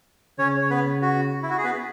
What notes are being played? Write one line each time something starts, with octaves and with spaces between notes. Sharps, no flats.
C#3 C#4 C#5
C#5
B3 B4
F#4
E4
F#4
G#4
B3 B4